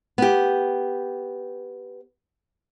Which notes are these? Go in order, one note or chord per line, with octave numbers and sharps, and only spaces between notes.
B3 G4